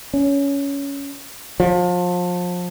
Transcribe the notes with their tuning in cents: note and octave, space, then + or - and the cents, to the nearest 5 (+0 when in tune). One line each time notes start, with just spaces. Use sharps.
C#4 +15
F3 +30